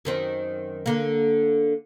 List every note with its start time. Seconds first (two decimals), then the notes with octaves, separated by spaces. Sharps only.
0.05 F#2 D#3 C4
0.86 D3 A#3